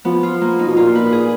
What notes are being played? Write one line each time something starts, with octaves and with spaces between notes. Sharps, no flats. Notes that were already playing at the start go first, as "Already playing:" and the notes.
F3 B3
F4
A#3
D#4
B2
A#2 F4
B4
G#4